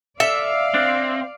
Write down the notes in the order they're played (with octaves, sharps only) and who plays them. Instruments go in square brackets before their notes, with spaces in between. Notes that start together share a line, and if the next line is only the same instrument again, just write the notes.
[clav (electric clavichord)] A4 [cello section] D5 F5 [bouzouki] E5
[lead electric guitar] C4 [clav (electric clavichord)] D4